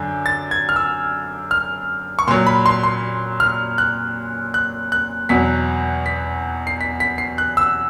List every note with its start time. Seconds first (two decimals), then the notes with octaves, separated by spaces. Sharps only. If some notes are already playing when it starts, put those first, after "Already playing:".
Already playing: F#2 D3
0.26 A6
0.51 G#6
0.69 F6
0.76 E6
1.51 F6
2.19 C#6
2.27 A#2 F#3 C6
2.47 B5
2.66 C6
2.83 C6
3.40 F6
3.78 F#6
4.54 F#6
4.92 F#6
5.29 E2 B2 F#3 B6
6.06 B6
6.67 C7
6.81 B6
7.00 B6
7.18 C7
7.38 F#6
7.57 E6